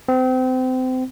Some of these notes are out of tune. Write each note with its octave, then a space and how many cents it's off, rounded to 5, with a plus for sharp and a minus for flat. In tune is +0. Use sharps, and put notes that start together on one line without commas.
C4 -30